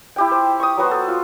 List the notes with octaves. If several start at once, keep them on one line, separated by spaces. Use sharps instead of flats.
E4 G4 G5
C5
C#6 D#6
F#3 B3 F#4 C5
A4
F4